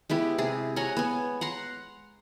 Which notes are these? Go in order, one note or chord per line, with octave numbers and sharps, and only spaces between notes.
G#3 B3 E4 G4
C3 G#4
C#5 F#5 G#5 A#5
B3 G#5
F#5 A#5 C6